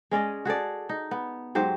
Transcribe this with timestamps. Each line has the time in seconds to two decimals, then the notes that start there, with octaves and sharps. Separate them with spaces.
0.11 G#3 C#4 D5 D#5
0.45 F#4 G#4 A4 D5
0.89 D#4
1.11 B3
1.55 G#2 F#3 G4 C5